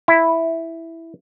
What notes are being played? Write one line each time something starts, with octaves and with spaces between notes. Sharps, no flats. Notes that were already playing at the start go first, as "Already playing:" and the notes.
E4